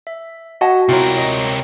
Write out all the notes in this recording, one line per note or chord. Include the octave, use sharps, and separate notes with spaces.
E5
F#4 D#5 F#5 A5
C3 E4 F4 A#4 C#5 G5
C#5 D#5